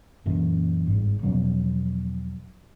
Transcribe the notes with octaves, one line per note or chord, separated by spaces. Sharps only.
F#2 A#2 E3
G1 G#2
E2 B2 F3 F#3